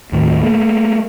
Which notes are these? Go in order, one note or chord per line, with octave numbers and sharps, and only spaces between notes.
D#2 A2 D#3
A3 A#3